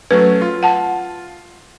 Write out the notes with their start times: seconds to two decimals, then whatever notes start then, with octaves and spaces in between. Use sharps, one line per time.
0.11 F#3 A3 C#4 B4
0.42 F4
0.63 F#5 A5